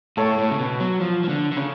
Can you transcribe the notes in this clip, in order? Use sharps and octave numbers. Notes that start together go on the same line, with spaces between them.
A2 A4 C#5
A2
C#3
B2
F#3
F3
F3
D3
D3
C#3